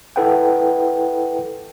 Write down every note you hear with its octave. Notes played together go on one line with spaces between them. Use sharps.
E4 A4 B4 F#5 G5